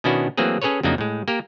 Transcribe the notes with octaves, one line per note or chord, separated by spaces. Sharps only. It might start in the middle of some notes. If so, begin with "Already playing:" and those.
B2 D#3 C#4 D4 E4 F#4
E3 F#3 A3 A#3 C4 G#4
C#4 G#4 A4 B4 C#5
F2 C#3 F#3 A#3 D4 D#4
A2 G#3
A#3 G4 A#4